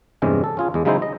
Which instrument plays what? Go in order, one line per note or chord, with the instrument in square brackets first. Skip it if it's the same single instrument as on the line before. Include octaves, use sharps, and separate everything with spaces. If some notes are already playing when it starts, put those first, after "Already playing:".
[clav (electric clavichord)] E2 G2 C3 G#3 C#4
A4
C#4 F4 G#4
E2 G#3
C#3 F#3 G#3 D#4 E4 C5
D#5